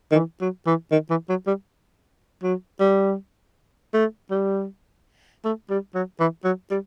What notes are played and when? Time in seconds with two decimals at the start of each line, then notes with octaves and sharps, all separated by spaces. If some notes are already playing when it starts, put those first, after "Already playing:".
0.12 D#3
0.15 E3
0.41 F#3
0.66 E3
0.91 D#3
1.10 E3
1.29 F#3
1.47 G3
2.42 F#3
2.80 G3
3.93 A3
4.31 G3
5.45 A3
5.70 G3
5.95 F#3
6.20 E3
6.44 F#3
6.71 G3